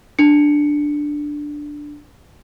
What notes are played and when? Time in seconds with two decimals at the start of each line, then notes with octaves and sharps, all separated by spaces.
0.19 D4 C#7